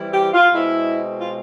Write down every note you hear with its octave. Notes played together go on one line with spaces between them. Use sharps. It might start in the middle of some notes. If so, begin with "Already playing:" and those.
Already playing: E3 G3 C4 E4
G4
F4
B2 G#3 C4 E4
F4